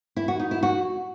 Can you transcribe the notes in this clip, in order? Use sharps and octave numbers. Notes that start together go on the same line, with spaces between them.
E4
F#4
D#4
E4
F#4